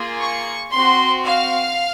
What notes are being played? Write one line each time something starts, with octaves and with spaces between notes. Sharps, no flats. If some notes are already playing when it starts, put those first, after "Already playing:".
Already playing: A#3 F4 G#4
C#6
C4 F#4 C6
F5